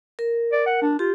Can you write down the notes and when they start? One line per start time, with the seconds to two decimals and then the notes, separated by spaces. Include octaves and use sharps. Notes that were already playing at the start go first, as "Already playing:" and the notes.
0.19 A#4
0.52 D5
0.66 F#5
0.82 D4
0.99 F4 G4